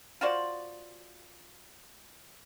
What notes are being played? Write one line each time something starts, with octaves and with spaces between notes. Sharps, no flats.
F4 F#4 C5 D5